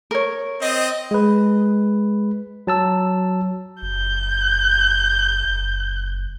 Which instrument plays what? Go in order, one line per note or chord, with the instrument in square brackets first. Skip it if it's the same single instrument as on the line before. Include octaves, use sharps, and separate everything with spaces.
[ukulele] A#4 C#5
[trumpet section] C4 D#5
[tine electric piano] G#3 B4
F#3 A5 E6
[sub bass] F#1 [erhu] G6
[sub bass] F#1